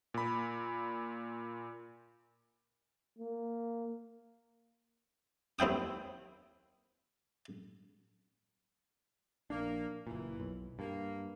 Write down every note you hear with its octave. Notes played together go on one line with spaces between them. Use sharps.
A#2 B5
A#3
D#2 C4 E4 G5 D#6
A#1 A#3 D4
F#1 A#2 E3
B1
G2 A#3